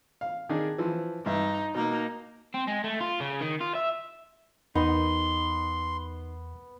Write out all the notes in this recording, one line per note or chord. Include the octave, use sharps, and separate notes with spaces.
F5
D#3 D4 G#4
E3 F3
G2 D#4 E5
B2 A#3 D#4
C4
G#3
A3
F4
C#3
D#3
F4
E5
E2 B3 D#4 C6